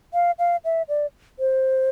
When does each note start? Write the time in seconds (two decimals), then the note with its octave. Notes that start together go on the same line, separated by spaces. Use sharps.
0.14 F5
0.39 F5
0.65 E5
0.89 D5
1.39 C5